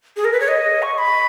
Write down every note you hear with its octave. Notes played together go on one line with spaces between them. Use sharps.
G#4
A#4
B4
C#5
D#5
C#6
C#6
B5